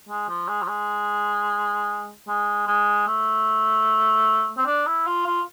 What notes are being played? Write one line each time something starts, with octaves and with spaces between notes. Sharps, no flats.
G#3
F3
G#3
F3
G#3
G#3
G#3
A3
C4
D4
E4
F4
F4